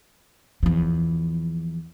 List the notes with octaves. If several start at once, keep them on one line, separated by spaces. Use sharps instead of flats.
E2 F3